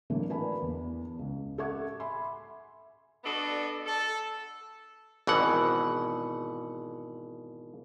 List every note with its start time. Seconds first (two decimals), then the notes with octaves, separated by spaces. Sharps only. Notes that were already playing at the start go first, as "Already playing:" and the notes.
0.10 E3 F#3 A3 A#3 D4 F#4
0.29 A#4 B4 D5 G#5 A5 B5
0.62 E2
1.19 C#2
1.58 A4 E5 F#5 C#6 D6 G#6
2.00 E5 G#5 B5 C6
3.24 B3 D4 F#4 A4 D5 D#5
3.86 A4
5.27 G#1 B2 E3 F#5